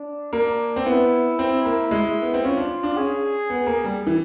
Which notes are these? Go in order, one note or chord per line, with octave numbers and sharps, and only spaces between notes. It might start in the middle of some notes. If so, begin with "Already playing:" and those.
Already playing: D4
A#3 D4
C4
B3 E4
C4
A#3
G#3
B3
C4
C#4 F4
D4
D4
C#4 G#4
B3
A#3
G3
E3